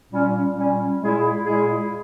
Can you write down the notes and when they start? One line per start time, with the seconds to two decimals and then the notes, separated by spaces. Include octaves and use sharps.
0.10 A#2 G3 C#4
0.55 A#2 G3 C#4
1.01 A#2 G#3 E4 G#4
1.46 A#2 G#3 E4 G#4